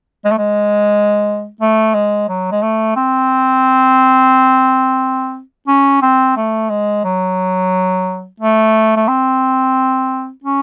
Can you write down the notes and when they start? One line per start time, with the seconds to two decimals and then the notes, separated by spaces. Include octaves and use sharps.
0.25 G#3
0.31 A3
0.38 G#3
1.61 A3
1.94 G#3
2.29 F#3
2.52 G#3
2.62 A3
2.96 C4
5.68 C#4
6.02 C4
6.37 A3
6.70 G#3
7.04 F#3
8.40 A3
8.97 A3
9.08 C4
10.44 C#4